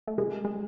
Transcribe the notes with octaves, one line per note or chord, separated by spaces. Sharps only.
A3
G#3 G#4
G#3